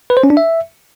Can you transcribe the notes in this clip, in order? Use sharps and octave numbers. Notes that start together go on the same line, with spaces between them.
B4
C5
C#4
D4
E5